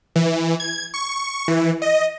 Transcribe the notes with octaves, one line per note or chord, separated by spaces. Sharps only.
E3
G#6
C#6
E3
D#5